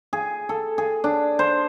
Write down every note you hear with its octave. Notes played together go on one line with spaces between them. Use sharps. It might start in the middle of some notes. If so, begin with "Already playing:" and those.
G#4
A4
G#4
D4
C5